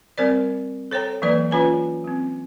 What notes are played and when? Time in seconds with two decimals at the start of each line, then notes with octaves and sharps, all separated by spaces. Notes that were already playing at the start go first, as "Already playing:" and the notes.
0.18 G3 C4 A#4 C5 D5
0.91 A4 C5 C#5 G5 A#5
1.22 E3 F#3 A#3 B4 D5
1.51 C#4 F4 B4 C#5 G#5
2.04 F#3 C4